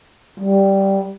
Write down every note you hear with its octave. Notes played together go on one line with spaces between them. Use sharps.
G3